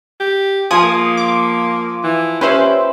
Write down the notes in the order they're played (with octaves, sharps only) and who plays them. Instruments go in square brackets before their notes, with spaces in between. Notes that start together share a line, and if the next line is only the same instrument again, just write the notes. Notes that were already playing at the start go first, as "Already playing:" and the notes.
[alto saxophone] G4
[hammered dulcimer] F3 G#4 [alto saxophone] G#5 [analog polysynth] D#6
[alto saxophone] A#3
[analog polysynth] D6
[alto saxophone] E3
[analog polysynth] C#4 C5 [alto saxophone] G4 [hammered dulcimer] B4 E5